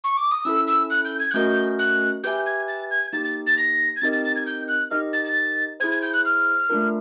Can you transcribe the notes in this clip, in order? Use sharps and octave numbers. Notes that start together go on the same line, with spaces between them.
C#6
D6
D#6
C#4 E4 A4 E6
E6
F#6
G6
G#6
F#6
A3 C#4 F#4 A#4 D#5 G6
F#6
G4 B4 E5 G#5 G6
G#6
A6
G#6
A#3 D#4 G4 A6
A6
A6
A#6
G#6
C4 D#4 G4 A#4 D#5 A6
A6
A6
G#6
G6
F#6
D#4 G4 A#4 D#5 F6
A6
A6
E4 G#4 C5 G#6
G#6
G6
F#6
F6
A3 D4 F4 A#4